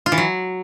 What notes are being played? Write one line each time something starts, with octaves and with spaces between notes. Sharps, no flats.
F4
E3
F#3